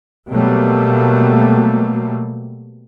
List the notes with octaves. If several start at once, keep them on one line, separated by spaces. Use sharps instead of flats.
B2 F#3 G3 A3 A#3